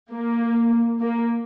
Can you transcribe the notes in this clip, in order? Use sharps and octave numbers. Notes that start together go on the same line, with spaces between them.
A#3
A#3